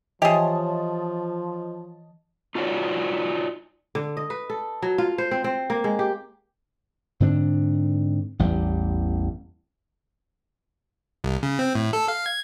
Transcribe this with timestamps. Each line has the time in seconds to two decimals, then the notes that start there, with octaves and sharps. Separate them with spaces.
0.22 E3 F3 G4 G#4 C#5 D#5 A5
2.55 D#4 F4 F#4 A4 C#5 D5
3.95 D3
4.17 D#5
4.30 B4
4.50 A4
4.82 F#3
4.98 F4
5.18 C5
5.31 C4
5.44 C4
5.70 A#3
5.84 G#3
5.99 G4
7.20 G#2 D3 C4 D4
8.39 A1 E2 G3
11.24 C2
11.43 C#3
11.59 C4
11.75 A2
11.93 A4
12.08 F5
12.26 G#6